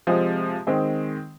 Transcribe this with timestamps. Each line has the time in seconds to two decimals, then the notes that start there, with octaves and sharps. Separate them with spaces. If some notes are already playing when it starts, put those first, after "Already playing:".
0.07 C3 F3 G#3 C4
0.67 D#3 G#3 C4